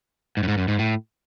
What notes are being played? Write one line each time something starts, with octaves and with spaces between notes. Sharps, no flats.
G#2
F#2
G#2
F#2
G#2
A2